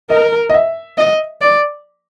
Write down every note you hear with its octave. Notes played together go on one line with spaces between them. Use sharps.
A#4 D#5
D#5
E5
D#5
D5